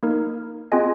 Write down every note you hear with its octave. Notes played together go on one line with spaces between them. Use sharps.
A#3 D#4 A#4
C4 F4 G#4 D#5 G#5